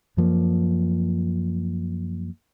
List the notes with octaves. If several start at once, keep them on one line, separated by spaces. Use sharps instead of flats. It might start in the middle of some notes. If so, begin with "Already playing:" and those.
F#2 F3 A#3